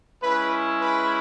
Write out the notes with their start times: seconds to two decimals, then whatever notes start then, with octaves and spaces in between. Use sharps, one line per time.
0.22 G#3 C#4 E4 B4
0.81 B4